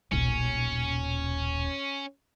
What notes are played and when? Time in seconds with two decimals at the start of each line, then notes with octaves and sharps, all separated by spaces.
0.12 D#1 B1 C#4